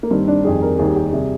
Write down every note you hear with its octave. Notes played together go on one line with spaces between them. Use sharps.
A#3
G2 D#3 G3 C4
D4
F2 D#3 G3 G#4
A#4
D#2 D#3 G3 G#4
G4
C3 G3 G#4